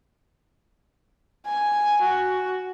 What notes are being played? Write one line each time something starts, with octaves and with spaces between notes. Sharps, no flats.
G#5
F#4